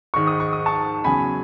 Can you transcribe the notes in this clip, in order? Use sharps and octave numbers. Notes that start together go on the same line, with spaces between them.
G#2 D#3 G#3 C#6
D#6
C#6
D#6
A5 C#6
E2 C#3 F#3 G#5 B5